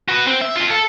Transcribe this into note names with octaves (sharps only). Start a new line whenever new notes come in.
F#4 B4
C4
E5
C4 F4
A4